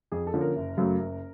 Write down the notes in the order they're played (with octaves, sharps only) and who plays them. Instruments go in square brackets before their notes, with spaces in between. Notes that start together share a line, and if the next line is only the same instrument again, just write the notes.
[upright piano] F2 G#4
A4
D3 F3 A#3 C#4
A#4
F#1
F#2 C#3 F#3 A3
F#1